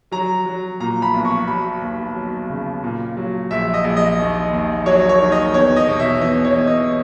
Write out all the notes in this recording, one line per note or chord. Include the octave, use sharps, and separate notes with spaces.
F#3 A#5
F#3
A#2 A#5
B5
B1
C#6
F#3 B5
D#2
F#3
C#3
A#2
F#3
A#1 E5
D#5
A#1
D#5
D#2
D#2
F#3 C#5
C#5
D#3
D#5
E2 C#5
D#5
B2
E5
E2 D#5
C#5
E2
D#5